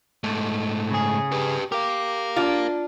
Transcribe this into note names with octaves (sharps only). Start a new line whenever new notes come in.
G#2 A3
C#3 G#4
G4 B4
G4 A#4 F5
D4 F4